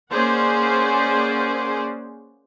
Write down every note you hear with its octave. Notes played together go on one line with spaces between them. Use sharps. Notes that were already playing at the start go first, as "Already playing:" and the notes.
A#3 C#4 G#4 C5 D5 F#5